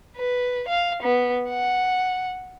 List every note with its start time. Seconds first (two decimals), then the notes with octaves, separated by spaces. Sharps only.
0.17 B4
0.68 F5
1.03 B3
1.49 F#5